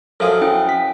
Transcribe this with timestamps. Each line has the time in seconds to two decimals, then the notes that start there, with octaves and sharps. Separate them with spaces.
0.20 F#2 F3 G#4 A4
0.42 C#4 E4 G5
0.69 B6